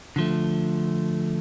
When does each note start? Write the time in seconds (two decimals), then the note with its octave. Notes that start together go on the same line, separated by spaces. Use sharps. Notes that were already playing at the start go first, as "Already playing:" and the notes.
0.16 D3 F3 A3